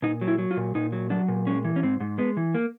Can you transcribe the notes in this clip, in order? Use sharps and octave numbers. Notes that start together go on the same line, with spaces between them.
A#2 D#4
F#3
E4
F#3
F4
A#2
A#2 D#4
F#3
F#3 D4
A#2
G#3 C#4
E3
C#4
G#2 C4
G#2
G#3 B3
E3
A#3